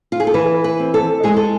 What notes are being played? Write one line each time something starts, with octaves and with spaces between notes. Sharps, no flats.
F4
G#4
A4
E3 B4
B4
C4
A4
G#3 G#4
A4